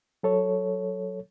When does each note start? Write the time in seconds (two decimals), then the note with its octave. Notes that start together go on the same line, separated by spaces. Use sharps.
0.23 F#3 A4 C#5